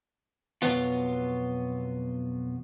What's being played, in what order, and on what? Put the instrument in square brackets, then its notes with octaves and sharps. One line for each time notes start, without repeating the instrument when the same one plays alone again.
[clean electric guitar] B1 F2 F#3 B3 F4